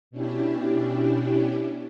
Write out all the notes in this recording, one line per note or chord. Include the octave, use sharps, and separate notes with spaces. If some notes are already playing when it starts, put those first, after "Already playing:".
B2 C#4 D4 E4 G4